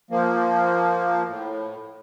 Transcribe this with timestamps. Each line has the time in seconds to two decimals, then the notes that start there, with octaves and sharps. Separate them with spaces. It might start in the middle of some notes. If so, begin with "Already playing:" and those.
0.11 F3 A#3
1.27 A2